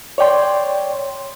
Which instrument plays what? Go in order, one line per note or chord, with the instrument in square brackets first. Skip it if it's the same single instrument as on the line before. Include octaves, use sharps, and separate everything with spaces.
[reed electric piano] C#5 D5 G5 C6